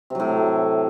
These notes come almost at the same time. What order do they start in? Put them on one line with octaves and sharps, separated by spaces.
C3 F#3 A2